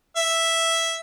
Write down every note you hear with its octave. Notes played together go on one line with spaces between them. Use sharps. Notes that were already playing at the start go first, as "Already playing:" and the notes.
E5